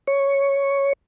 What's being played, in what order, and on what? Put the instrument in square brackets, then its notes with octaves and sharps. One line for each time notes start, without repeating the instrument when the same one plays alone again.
[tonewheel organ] C#5